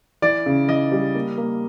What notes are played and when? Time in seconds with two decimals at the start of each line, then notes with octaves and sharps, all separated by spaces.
0.22 E3 D5
0.46 C#3
0.68 E3 D#5
0.92 G3
1.15 A#3
1.38 A#3